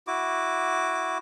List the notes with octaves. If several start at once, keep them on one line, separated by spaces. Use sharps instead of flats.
E4 F#4 D6